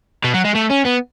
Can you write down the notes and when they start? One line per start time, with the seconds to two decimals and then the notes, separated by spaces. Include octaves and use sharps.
0.24 B2
0.34 F#3
0.44 G#3
0.55 A3
0.70 C#4
0.85 B3